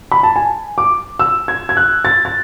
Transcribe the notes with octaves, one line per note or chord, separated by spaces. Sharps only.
B5
A5
G#5
D6
E6
G#6
G#6
F#6
A6
A6